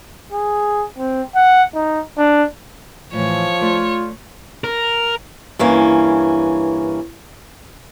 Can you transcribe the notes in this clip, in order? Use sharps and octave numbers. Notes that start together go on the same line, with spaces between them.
G#4
C4
F#5
D#4
D4
A2 E3 F3 C#5
A3 F4 D5
A#4
G2 E3 A#3 C#4